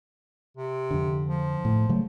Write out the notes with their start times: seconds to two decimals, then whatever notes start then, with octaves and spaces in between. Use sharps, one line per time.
0.57 C3
0.91 F2 D3
1.26 F3
1.65 A2
1.89 C#3 F#3 A3